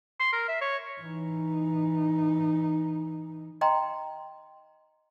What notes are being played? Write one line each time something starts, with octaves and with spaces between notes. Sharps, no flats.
C6
A#4
E5
C#5
E3 D#4
D#5 G5 A#5 C6